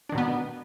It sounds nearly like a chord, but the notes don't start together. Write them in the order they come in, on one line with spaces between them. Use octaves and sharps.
D4 D#3 B2 B3